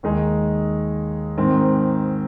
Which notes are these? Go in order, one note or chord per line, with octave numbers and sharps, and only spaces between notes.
D#2 D#3 G#3 D#4 G#4
G#2 D#3 C4